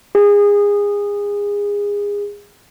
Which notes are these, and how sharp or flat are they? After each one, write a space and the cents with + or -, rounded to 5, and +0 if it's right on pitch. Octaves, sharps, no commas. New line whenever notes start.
G#4 -25